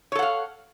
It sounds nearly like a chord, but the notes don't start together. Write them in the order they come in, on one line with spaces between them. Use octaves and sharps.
C#5 A4 F#5 F5